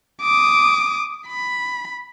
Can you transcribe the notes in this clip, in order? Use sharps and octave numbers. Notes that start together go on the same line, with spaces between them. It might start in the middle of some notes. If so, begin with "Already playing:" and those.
D6 D#6
B5